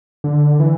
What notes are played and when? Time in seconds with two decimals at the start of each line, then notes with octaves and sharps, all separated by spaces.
0.24 D3
0.60 E3